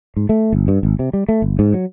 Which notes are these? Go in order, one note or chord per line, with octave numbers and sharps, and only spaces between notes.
G#2
A3
G1
G2
G#1
C3
G3
A3
G1
G#2
F#3